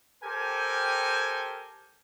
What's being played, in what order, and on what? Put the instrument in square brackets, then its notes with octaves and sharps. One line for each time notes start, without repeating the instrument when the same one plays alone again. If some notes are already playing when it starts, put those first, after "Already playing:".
[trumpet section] G4 A4 A#4 C5 G5 G#5